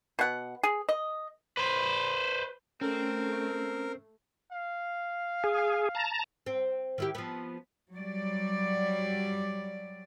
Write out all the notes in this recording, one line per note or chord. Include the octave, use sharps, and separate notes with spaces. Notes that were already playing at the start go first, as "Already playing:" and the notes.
B2 F#5
G#4
D#5
B4 C5
A3 C4 C#4 A#4
F5
G#4
A5 A#5
C4
D#3 E4 G4
F3 B3
F#3 G3 D5